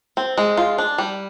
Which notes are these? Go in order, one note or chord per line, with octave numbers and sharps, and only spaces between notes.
C4
G#3
F4
D4
G3